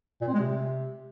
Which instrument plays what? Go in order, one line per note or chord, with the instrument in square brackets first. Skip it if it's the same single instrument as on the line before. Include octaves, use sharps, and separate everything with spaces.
[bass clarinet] A#2
C4
G#3
C3